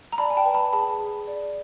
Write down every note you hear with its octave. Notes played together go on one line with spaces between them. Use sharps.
A#5
D5 A5 B5
G#5
G5 A5
B4
A5 B5
G#4 A5 B5
G#4
D5